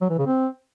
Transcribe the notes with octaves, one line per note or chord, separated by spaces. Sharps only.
F#3
E3
C#3
C4